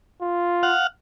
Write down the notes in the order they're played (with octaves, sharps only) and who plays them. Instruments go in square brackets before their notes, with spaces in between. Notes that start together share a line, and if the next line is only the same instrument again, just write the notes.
[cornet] F4
[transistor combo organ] F5 F#5